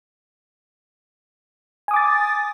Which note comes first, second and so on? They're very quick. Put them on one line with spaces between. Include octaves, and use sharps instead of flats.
G#5 D#6 D6 A6